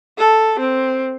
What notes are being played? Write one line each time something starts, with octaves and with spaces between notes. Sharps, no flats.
A4
C4